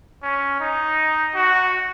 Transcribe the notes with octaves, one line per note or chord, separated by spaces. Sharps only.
C#4
D#4
F#4